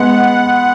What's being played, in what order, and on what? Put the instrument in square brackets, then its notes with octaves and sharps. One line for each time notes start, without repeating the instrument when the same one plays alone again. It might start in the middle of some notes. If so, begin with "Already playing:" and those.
Already playing: [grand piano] G#3 B3 [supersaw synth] F#5